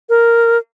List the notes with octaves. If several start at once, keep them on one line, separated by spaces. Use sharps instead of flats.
A#4